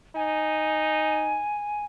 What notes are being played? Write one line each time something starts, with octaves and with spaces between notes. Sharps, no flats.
D#4 G#5